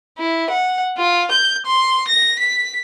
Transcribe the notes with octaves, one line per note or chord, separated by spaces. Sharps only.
E4
F#5
F4
G6
C6
A#6
B6